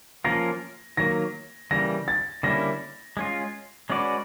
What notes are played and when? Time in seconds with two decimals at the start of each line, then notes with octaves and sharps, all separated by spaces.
0.25 F3 A#3 C#4 F4 A#4 A#6
0.97 D#3 F#3 A#3 A#6
1.71 C#3 E3 G3 A#3 A#6
2.08 A6
2.43 D3 G3 A#3 C#4 E4 A#6
3.17 G#3 C#4 F4
3.90 G#3 C#4 F#4 B4 D5